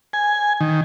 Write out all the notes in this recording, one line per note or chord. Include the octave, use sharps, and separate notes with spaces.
G#5
D#3